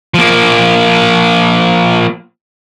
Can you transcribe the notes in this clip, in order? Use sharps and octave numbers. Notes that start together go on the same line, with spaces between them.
F3 A#3